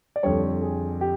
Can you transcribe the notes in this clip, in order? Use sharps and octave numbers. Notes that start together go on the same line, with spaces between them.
D5
F2 D3 G3 C#5
G#4
G4